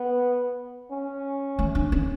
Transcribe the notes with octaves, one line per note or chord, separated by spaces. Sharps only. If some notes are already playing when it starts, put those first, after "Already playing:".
Already playing: B3
C#4
A3
D4
C#4